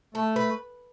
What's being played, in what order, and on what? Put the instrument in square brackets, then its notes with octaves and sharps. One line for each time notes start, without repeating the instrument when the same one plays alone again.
[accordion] A3 [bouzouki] A4
[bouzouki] B4